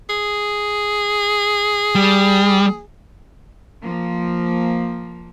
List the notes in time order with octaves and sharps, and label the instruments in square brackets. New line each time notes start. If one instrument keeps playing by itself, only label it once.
[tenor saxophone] G#4
[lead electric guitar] G3
[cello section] F3 A#3